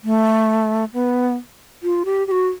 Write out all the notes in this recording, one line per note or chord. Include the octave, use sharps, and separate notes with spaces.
A3
B3
F4
G4
G4
F#4